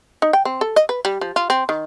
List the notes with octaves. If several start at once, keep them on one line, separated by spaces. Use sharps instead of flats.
D#4
G5
C4
A4
D#5
B4
G3
F3
F4
C4
D#3